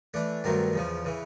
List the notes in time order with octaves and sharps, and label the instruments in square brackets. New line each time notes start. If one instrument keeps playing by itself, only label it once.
[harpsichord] E3 A3 D4
G2 D#3 F#3 A3 C4
E2 C#3 F3
C#3 E3